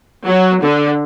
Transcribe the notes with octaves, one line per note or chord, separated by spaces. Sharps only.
F#3
D3